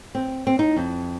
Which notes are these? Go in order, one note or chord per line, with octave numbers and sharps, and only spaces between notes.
C4
C4
D#4
F2